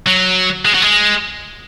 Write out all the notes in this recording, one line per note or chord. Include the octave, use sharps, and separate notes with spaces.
F#3
G#3
F#3
G#3